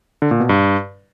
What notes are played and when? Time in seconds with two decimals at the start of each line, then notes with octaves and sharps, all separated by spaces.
0.22 D3
0.31 A#2
0.40 B2
0.49 G2